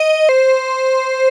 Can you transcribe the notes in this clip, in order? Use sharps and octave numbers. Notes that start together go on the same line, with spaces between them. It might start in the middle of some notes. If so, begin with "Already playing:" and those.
Already playing: D#5
C5